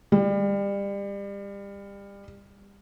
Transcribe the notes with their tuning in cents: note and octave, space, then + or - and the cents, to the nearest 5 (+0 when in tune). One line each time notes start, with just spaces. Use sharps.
G3 +30